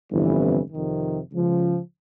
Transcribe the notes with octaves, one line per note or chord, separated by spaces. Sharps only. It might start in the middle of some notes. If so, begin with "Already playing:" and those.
G1 F2 C3 E3
F2 C3 D#3
C#2 C#3 F3